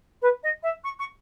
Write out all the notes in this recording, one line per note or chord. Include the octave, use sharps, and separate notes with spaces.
B4
D#5
E5
C#6
C#6